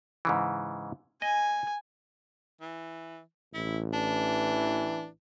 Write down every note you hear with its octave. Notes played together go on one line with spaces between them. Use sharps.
G#2 C#3 E3
D#5 G#5
E3
A1 E4
E3 D4